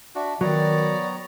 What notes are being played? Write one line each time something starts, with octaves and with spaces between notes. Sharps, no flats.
D4 F#4 E5
D#3 F#3 B3 C#5 D5 A#5